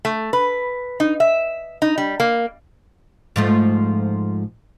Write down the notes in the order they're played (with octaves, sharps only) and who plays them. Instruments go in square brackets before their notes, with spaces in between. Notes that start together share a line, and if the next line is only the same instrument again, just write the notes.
[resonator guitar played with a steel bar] A3
B4
D#4
E5
D#4
G3
A#3
[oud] G#2 F3 A3